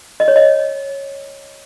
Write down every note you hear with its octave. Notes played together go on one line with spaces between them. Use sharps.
D#5
C#5
D#5